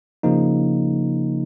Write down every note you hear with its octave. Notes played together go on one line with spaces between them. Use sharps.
C#3 F3 A#3 D#4